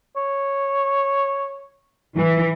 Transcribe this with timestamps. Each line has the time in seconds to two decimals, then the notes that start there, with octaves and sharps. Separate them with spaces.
0.17 C#5
2.17 E3